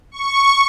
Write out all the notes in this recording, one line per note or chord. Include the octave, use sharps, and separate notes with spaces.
C#6